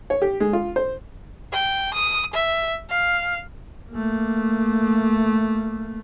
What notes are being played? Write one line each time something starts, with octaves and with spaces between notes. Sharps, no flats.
C#5
G4
G#3
F4
C5
G5
D#6
E5
F5
A3 A#3